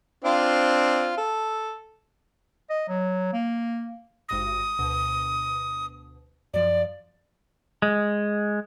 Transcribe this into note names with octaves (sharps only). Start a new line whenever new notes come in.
C4 D4 F4
A4
D#5
F#3
A#3
G#1 G2 D#6 A#6
D2 B2
F#2 F3 D5
G#3